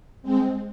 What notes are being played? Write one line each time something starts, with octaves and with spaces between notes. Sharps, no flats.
G#3 C4